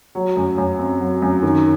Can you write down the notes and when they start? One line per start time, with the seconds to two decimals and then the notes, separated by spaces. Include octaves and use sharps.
0.15 F#3
0.37 F#2
0.58 F#2
0.79 C4
1.00 F#3
1.22 F#2
1.43 D#3